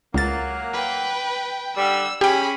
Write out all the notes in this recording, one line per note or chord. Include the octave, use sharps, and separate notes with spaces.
C#2 F#3 A#3 A6
B4 G5
D3 G3 E6
C#4 G4 G#4 G5 B5